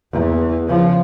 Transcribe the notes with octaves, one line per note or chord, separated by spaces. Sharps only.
E2
C#3 F3